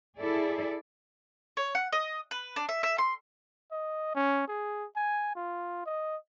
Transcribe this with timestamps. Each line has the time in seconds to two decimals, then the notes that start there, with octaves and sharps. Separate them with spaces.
0.18 E4 G#4 A4 D5
1.57 C#5
1.75 F#5
1.93 D#5
2.31 B4
2.56 D4
2.69 E5
2.83 E5
2.98 C6
3.71 D#5
4.15 C#4
4.48 G#4
4.96 G#5
5.36 F4
5.86 D#5